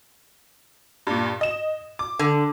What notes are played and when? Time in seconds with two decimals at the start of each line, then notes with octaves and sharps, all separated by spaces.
1.07 G2 A#2
1.41 D#5 E7
1.99 D6
2.19 D3